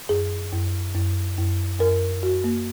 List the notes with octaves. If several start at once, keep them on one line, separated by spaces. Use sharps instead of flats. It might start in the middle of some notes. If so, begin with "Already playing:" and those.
F#2 G#4
F#2
F#2
F#2
F#2 A#4
F#2 F#4
A#3